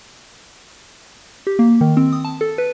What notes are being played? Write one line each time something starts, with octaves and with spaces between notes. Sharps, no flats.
G4
A#3
D#3
C4
D#6
A5
A4
B4